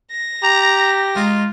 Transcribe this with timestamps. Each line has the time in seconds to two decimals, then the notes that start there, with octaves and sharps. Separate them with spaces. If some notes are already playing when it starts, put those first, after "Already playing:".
0.11 A#6
0.43 G4 A#5
1.15 G#3 D#4 F4